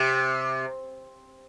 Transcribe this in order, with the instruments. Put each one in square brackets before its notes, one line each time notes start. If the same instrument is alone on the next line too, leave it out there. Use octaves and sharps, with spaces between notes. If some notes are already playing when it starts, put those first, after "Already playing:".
Already playing: [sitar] C3